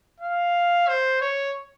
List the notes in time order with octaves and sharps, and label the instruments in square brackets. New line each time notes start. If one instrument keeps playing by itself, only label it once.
[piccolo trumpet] F5
C5
C#5